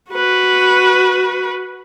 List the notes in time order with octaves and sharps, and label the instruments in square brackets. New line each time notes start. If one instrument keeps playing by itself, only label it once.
[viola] F#4 B4